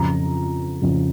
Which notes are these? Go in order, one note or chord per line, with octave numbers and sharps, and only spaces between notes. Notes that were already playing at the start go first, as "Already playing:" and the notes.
Already playing: F2 C#3 F3 A#5
F2 C#3 F3